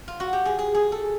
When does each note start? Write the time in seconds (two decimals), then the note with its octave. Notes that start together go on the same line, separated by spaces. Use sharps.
0.08 F4
0.20 F#4
0.33 G4
0.45 G#4
0.59 G#4
0.74 G#4
0.92 A4